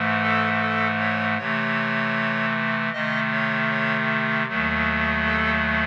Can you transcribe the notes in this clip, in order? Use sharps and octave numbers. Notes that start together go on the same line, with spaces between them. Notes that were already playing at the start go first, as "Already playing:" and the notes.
Already playing: G#2 E3 A3
A4
A4
C#5
C3 E3 A3 C#5
C3 D#3 A3 D#5
C#5
C#5
D#2 D#3 F#3 A3
A4